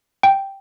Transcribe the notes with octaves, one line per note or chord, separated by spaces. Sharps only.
G5